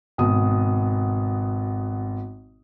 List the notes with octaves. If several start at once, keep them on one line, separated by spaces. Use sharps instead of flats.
G#1 B2 D#6